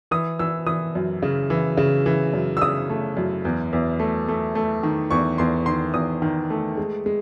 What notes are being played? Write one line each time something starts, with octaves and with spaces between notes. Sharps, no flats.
E3 D#6
E3 E6
E3 D#6
F#2
C#3
E3
C#3
E3
F#2
E6
C#3 D#6
A3
F#2
E2
E2
A3
A3
A3
D#3
E2 C#6
E2 C6
D#3 C6
E2 D#6
D#3
A3
G#3
G#3